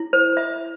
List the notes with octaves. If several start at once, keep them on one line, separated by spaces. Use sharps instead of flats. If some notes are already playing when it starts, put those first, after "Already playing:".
Already playing: E4
C5
E5